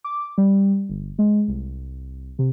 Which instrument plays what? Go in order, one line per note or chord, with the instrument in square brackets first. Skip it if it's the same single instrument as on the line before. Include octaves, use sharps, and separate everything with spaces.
[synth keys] D6
G3
G1
G#3
C2
C3